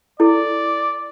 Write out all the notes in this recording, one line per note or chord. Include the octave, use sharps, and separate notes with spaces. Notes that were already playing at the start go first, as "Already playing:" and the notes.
E4 A4 D5